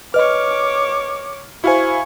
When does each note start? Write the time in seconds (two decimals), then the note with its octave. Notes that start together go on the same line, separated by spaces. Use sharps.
0.14 B4 C#5 D#5 D6 F6
1.64 E4 F#4 C5 F5 G#5 C#6